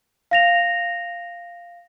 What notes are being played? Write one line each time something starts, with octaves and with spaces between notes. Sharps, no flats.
F5 A#6 F7